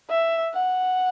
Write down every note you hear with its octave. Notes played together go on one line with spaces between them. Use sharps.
E5
F#5